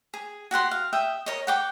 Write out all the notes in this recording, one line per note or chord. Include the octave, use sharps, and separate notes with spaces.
G#4
F#4 G4 F#5 C6
F5
E5 G5 D#6
A#4 C#5 D#5
F#5 G5 D6